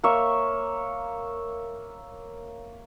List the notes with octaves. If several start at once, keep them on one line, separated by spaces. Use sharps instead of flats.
A#3 C#5 E5